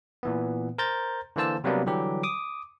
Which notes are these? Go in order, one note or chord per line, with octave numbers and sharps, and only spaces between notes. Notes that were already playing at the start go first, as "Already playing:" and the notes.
A#2 E3 B3
A#4 C5 A#5 G6 A6
D3 E3 A#3 C5 A5 E6
C3 F#3 G3 A#3 B3 D4
D3 E3 F#3 G3 G4
D6 D#6